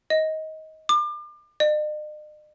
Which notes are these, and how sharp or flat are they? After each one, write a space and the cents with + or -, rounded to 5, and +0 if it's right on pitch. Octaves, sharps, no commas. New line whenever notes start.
D#5 +20
D6 +35
D#5 -45